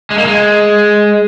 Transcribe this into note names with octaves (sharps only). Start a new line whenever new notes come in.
G#3
A#3
G#3